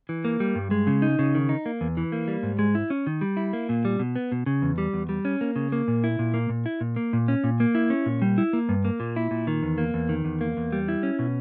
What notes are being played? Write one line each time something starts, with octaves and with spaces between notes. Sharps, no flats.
E3
A#3
G3
G2
G#3
C#3
D#4
C#3
D#3
D#4
A#3
E2
E3
A#3
G3
G#2
G#3
E4
C#4
D#3
G3
E4
A#3
A#2
G3
B2
B3
B2
C#3
E2
G3
E2
G3
C#4
A#3
C#3
A#3
A#2
E4
A#2
A#3
A#2
E4
A#2
A#3
A#2
C#4
A#2
A#3
E4
C#4
A#2
G3
E4
A#3
G2
A#3
A#2
E4
A#2
D#3
E2
A#3
E2
D#3
E2
A#3
E2
G3
E4
C#4
B2